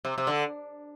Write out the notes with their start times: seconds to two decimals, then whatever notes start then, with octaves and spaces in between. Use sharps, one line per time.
0.05 C3
0.18 C3
0.27 D3